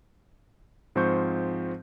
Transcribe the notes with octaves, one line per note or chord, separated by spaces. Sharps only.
G#2 F3 C4 C5 C#6 G6